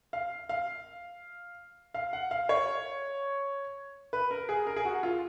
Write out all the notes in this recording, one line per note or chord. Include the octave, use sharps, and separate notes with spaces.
F5
F5
F5
F#5
F5
C#5
B4
A#4
G#4
A#4
G#4
F#4
F4